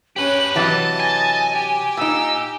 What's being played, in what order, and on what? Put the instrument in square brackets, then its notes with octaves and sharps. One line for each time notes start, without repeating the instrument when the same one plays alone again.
[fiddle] C#4 [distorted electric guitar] G4 B4 [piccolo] F#7
[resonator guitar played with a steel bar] C3 E3 F#3 [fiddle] D#5 [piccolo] A5
[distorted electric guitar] G#5
[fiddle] G4
[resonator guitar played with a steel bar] A#2 D#4 [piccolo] E6